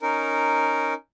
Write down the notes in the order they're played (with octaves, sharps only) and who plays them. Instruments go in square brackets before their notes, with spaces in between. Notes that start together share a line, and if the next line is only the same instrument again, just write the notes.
[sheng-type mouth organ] C#4 D#4 A#4